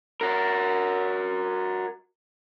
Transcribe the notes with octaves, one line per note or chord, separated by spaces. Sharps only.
F#4 A#4